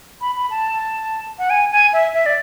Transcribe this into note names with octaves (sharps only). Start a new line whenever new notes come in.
B5
B5
A5
F#5
G#5
G#5
E5
E5
D5